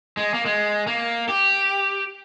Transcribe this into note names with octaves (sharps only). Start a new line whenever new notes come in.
G#3
A#3
G#3
A#3
G4